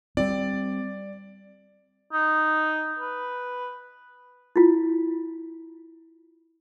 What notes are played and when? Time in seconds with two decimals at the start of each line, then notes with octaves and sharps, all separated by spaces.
0.17 G3 C4 D5
2.12 D#4
2.99 B4
4.56 E4 F4